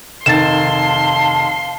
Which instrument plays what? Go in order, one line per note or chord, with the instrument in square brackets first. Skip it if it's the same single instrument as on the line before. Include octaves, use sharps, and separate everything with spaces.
[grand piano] F1 D#3 A6 [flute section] F5 A5 [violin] C6 [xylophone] E7